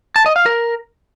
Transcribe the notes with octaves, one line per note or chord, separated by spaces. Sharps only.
A5
D#5
F5
A#4